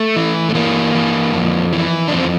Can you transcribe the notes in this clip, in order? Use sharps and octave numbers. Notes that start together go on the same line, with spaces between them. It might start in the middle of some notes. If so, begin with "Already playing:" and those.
Already playing: A3
E3
A3
E3 A#3
E3
F2
E3
D4
F2 C4